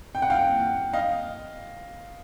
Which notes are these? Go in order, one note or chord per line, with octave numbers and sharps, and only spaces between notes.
G5
F#5
F5 G5
D#5 F5